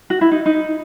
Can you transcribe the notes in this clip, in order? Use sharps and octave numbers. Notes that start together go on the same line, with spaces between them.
F#4
E4
D#4
D#4